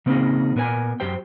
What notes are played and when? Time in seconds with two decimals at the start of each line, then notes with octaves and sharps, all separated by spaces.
0.06 C#3 A#3 C4 C#4 D#4 G#4
0.56 A#2 B3 A#4 C5 G#5
1.00 F#2 G4 C5 G5